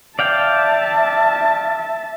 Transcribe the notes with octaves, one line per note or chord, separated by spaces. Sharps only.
D5 E5 F5 G5 A5